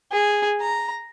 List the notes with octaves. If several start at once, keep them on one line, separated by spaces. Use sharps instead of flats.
G#4
A#5